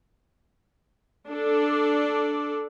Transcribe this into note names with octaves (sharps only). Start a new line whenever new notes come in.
D4 A4 D5